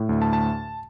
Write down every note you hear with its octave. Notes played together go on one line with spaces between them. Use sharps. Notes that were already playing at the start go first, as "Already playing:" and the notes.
Already playing: A2
D2
A5
A5